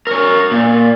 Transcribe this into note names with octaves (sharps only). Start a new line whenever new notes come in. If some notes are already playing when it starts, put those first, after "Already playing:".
A#4 C#5
A#2